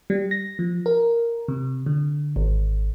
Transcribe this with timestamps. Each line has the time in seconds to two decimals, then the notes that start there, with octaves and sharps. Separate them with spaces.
0.10 G3
0.31 A#6
0.59 F3
0.86 A#4
1.48 C3
1.86 D3
2.36 G#1